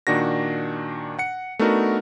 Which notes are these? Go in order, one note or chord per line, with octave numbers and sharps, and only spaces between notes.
A#2 D#3 D4 F#4 A#6
F#5 C#7
A3 B3 D4 D#4 F#4 A#4